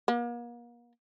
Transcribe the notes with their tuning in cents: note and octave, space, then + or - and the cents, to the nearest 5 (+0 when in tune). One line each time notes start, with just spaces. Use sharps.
A#3 +40